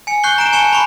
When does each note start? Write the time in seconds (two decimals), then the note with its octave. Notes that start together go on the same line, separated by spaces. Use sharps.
0.07 G#5 C#7
0.23 C#6 F#6 G6 C7 G7
0.38 A#5 D7 E7
0.53 G#5 A5 C#6 C#7 E7 G7
0.73 B5 C#6